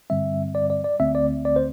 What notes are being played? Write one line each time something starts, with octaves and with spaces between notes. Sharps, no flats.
G2 D3 G3 C4 E5
D5
D5
D5
D2 D3 A3 C4 E5
D5
D5
C5